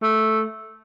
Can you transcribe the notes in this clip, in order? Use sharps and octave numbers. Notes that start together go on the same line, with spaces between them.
A3